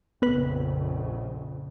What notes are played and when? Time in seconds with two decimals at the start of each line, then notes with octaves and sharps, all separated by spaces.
0.22 A#1 F2 C#3 B3 B4